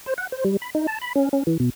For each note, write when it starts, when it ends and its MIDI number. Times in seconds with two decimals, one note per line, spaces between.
0.06 0.14 72
0.18 0.27 78
0.32 0.44 72
0.45 0.57 55
0.62 0.70 83
0.75 0.87 63
0.87 0.98 81
1.02 1.13 83
1.15 1.29 61
1.33 1.43 61
1.47 1.57 52
1.60 1.70 47